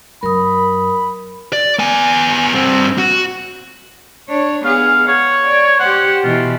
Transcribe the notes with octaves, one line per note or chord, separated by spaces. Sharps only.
F#2 A#4 B5 D#6
D5
B3 G#5
G2 C4
F#4
D4 C#5
B3 G#4 F5
C#5 F#5
D5
G4 C5 F#5
B2 E3 F4